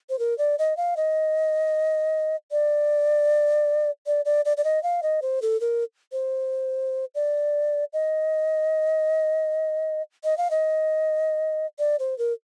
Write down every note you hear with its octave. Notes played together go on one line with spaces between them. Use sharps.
C5
A#4
D5
D#5
F5
D#5
D5
D5
D5
D5
D5
D#5
F5
D#5
C5
A4
A#4
C5
D5
D#5
D#5
F5
D#5
D5
C5
A#4